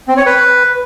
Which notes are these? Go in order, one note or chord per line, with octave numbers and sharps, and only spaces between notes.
C4
C#5
B4